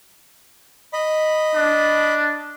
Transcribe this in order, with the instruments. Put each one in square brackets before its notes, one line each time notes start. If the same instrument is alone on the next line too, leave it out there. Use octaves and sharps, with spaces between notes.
[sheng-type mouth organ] D#5 B5
[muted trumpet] D4